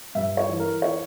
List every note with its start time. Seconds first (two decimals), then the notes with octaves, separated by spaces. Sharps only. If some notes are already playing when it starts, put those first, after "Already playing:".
0.15 G2 E5
0.37 C#5
0.49 E3
0.60 A#4
0.82 C#5